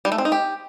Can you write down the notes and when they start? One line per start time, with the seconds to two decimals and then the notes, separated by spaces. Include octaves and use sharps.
0.05 G3
0.12 A3
0.18 C4
0.25 D#4
0.32 G4